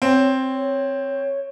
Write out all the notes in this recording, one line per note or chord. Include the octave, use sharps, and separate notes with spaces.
C4 C#5